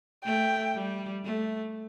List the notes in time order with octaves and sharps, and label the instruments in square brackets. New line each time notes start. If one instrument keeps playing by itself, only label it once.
[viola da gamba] A3 [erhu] G5
[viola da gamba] G3
A3